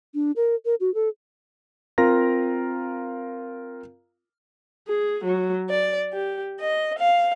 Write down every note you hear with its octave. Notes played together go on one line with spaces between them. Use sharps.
D4
A#4
A#4
F#4
A4
C4 F4 A#4 F5 A#5 A#6
G#4
F#3
D5
G4
D#5
F5